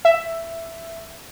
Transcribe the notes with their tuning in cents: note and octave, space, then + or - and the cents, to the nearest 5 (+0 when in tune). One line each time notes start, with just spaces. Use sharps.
E5 +10